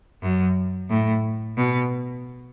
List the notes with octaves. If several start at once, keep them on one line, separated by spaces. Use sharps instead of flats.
F#2
A2
B2